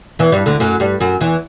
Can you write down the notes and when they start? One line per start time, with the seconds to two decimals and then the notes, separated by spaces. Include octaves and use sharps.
0.19 E2 E3
0.32 G2 G3
0.46 D2 D3
0.60 F#2 F#3
0.80 G2 G3
1.01 F#2 F#3
1.21 E2 E3